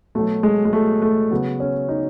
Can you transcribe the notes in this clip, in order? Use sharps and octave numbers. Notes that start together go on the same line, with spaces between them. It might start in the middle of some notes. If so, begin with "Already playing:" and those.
B2 F#3 A3
G#3
G#3
A3
A3
C#3 F#3 B3
C#4
D#4